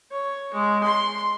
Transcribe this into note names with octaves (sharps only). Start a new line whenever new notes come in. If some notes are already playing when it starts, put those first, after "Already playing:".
C#5
G#3
C6